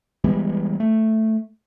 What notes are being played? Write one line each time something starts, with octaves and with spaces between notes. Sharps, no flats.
E3 G3 G#3 B3
A3